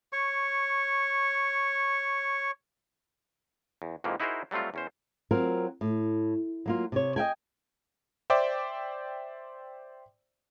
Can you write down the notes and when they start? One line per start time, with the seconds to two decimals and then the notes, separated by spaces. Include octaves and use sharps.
0.13 C#5 C#6
3.82 E2
4.04 F2 G#2 E3 F3 A#3
4.20 D#4 E4 F#4 G#4 A#4 C5
4.51 F#3 G3 A3 C4 F4
4.74 E2 C#4 C5
5.31 F#3 C4 F4 A#4
5.81 A2
6.66 F#3 A#3 F4
6.92 C3 C#5
7.16 D#5 E5 G5 G#5
8.30 C5 D5 E5 G5 D6